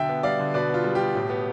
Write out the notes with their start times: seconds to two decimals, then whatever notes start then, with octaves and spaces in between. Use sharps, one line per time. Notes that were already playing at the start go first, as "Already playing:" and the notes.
Already playing: B2 D3 E5 G5
0.09 B3
0.23 G3 D5 F5
0.39 D3
0.54 B2 B4 D5
0.70 B3 F4
0.84 G3
0.95 B2 G4
1.15 A2
1.30 B3